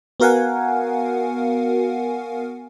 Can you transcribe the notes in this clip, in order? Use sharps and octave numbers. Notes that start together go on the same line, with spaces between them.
B3 F#4 A#4 F5 F#5 G#5